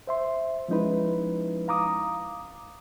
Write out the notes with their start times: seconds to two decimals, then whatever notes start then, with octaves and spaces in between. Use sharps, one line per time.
0.07 C5 E5 C6
0.68 F3 G#3 C#4 D#4 E4 B4
1.68 F5 A#5 D6 D#6